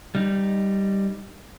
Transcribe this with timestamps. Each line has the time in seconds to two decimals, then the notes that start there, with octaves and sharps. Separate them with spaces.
0.15 G3 D#4